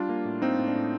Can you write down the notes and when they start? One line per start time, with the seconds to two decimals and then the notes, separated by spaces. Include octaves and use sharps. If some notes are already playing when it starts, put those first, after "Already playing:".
Already playing: G3 D4 F4
0.09 A#3
0.25 A2
0.42 A#3 C4 D#4
0.59 A2
0.67 D4
0.75 A2